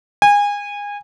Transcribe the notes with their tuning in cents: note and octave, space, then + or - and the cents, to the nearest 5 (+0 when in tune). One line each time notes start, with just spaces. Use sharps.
G#5 -25